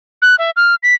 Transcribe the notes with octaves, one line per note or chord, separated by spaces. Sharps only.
F#6
E5
F6
B6